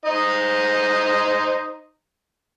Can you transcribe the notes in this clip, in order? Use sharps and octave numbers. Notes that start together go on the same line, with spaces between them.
D#4 C5 D#5